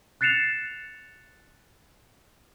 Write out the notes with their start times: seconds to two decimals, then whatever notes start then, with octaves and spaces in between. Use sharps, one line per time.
0.21 F#6 A6 C7 C#7 E7 F7